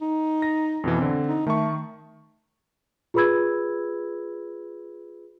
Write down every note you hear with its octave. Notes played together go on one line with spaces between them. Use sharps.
D#4
A#6
F2 B2 E3
D3 C4
D#4
D#3 A3 C#6
F4 G#4 B4 B5 E6 G#6